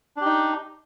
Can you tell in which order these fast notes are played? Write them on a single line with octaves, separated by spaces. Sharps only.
D4 G4 D#4